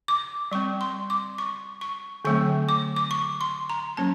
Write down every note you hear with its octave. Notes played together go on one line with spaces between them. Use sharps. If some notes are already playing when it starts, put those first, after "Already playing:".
D6
G3 C4 C#6
C6
D6
C#6
C#6
D3 F#3 A3 C4 C#6
D6
D6
C#6
C6
A#5
F#3 A#3 C#4 A5